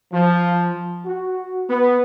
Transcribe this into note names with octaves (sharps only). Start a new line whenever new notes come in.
F3
F#4
B3